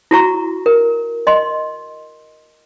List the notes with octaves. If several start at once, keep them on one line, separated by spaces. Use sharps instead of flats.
E4 F#4 A#5 C#6
A#4
D#5 C6